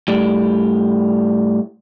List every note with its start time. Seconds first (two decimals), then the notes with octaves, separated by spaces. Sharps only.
0.08 A2 G3